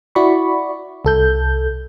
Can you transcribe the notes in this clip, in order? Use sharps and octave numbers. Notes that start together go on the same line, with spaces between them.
E4 F#4 D5 B5 C#6
C2 A4 G6